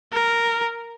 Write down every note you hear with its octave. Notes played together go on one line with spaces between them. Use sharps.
A#4